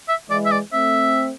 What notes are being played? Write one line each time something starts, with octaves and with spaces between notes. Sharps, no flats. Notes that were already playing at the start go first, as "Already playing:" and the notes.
E5
E3 G#3 D5
E5
D5
A3 C4 E5